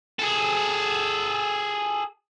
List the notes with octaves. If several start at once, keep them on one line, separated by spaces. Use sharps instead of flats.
G#4 A4